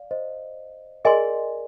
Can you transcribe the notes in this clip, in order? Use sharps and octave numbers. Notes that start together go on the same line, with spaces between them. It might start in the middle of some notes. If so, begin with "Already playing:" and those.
Already playing: D5 F5
C5 D#5
G#4 A#4 D5 D#5 G#5 C6